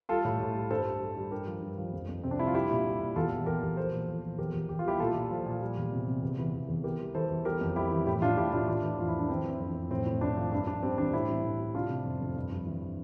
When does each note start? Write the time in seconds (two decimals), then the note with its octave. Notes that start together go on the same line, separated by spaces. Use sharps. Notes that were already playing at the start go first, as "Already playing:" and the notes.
0.09 G3 F4 A4
0.25 A2
0.40 A2
0.55 G3
0.70 G2 A4 C5
0.86 G3
1.01 G3
1.17 G3
1.31 G2 G4 A#4
1.47 F3
1.62 G2
1.78 F3
1.93 F2
2.09 F2
2.23 C3 C4
2.31 D4
2.39 G3 E4
2.47 F4
2.54 G3 E4 G4
2.70 A#2
2.86 G3
3.00 A#2
3.16 E2 F4 A4
3.31 E2
3.46 E2 G4 A#4
3.62 E2
3.77 F3 A4 C5
3.93 A#2
4.08 F3
4.23 F3
4.38 E2 G4 A#4
4.54 E2
4.69 E2 G4
4.79 F4
4.85 G3 E4 G4
5.00 A#2 F4 A4
5.16 A#2
5.31 F3
5.46 A#2
5.61 G3
5.77 E2
5.92 C3
6.07 C3
6.22 E2
6.38 E3
6.53 E2
6.68 E2
6.84 E3 G4 A#4
6.99 G3
7.14 E3 A4 C5
7.30 E2
7.45 G3 G4 A#4
7.61 F2
7.76 G3 E4 G4
7.91 E3
8.06 A2 E4 G4
8.22 A2 D4 F4
8.37 A2 E4 G4
8.53 A2 D4 F4
8.68 E3 D4 F4
8.83 E3
8.99 F2 F4
9.08 E4
9.14 G3 D4
9.29 E3 C4 E4
9.45 E3
9.60 F2
9.75 F2
9.91 A2 C4
10.06 A2
10.21 A2 D4
10.37 F3
10.52 G2 D4
10.67 G2 D4
10.82 G3 C4
10.98 E3 D4
11.13 A2 C4 E4
11.29 G3
11.44 A2
11.60 G3
11.75 C3 D4 F4
11.90 C3
12.05 F2
12.21 F2
12.36 G2
12.52 G2
12.67 E3